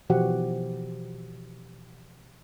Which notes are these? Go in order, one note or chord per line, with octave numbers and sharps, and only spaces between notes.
B2 E3 F3 F#4 G4 F#5